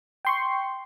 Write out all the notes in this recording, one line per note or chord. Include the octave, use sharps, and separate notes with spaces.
G5 C6 C#6